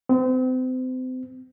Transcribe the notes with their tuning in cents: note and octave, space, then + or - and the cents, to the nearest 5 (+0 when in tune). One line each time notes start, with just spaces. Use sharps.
C4 -35